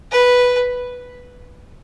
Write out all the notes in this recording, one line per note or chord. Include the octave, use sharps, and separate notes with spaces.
B4